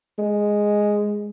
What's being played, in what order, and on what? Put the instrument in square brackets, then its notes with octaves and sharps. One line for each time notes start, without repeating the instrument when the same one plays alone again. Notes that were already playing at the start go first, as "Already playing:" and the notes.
[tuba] G#3